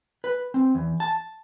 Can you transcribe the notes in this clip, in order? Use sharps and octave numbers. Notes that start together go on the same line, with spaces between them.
B4
C4
E2
A5